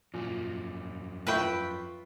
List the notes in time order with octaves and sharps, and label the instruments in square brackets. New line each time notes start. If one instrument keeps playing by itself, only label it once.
[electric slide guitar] F2 F#3 [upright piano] A#2
[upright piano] F4 B5 C#6 [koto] B4 E5 G5